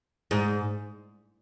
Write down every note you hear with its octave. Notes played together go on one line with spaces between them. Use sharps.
G#2